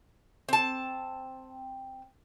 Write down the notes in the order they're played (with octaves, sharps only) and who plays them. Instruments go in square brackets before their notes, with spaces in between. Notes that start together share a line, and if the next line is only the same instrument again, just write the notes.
[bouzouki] C4 A5